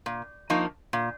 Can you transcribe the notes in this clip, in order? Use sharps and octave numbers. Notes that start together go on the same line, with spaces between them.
A#2
F3 A#3 D#4
A#2